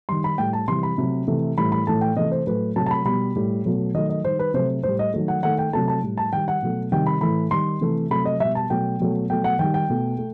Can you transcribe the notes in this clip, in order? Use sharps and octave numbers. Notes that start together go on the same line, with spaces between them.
D#3 G3 C6
B5
A2 G3 G5
A5
C3 E3 G3 C6
B5
C3 F#3 A3
C3 E3 A3
A2 E3 G3 B5
B5
A2 E3 A3 A5
G5
C3 E3 A3 D#5
C5
A2 F#3 A3 B4
C3 F#3 A3 A5
A5
B5
B2 G3 B5
A2 G3
B2 F#3 A3
D#3 F#3 A3 D#5
D#5
D#3 G3 C5
B4
C3 F#3 A3 C5
A2 G3 C5
D#5
D#3 F#3 A3
F#5
D#3 A3 F#5
G5
C3 F#3 A3 A5
A5
A2 G3
A5
D#3 G3 G5
F#5
B2 F#3 A3
C3 D#3 G3 G5
B5
A2 E3 A3 B5
D#3 G3 C6
C3 E3 A3
C3 F#3 A3 B5
D#5
B2 G3 E5
A5
B2 F#3 A3 G5
B2 F#3 A3
B2 F#3 A3 G5
F#5
D#3 G3 G5
G5
B2 A3
A3